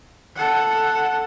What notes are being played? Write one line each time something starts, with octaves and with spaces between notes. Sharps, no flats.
A4 F#5